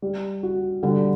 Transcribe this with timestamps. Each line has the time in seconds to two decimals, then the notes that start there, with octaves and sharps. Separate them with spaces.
0.02 G3
0.43 F#4
0.83 D3 G3